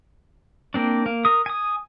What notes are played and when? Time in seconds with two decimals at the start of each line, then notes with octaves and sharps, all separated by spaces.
0.74 A#3 C4 D4
1.06 A#3
1.25 A#4 D#6
1.46 G#5 D#6